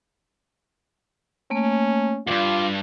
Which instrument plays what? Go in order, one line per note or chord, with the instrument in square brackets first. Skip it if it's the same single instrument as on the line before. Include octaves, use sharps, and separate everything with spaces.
[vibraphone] A3 A#3 [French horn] C#4
[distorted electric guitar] D2 G2 [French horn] F4 [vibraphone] D6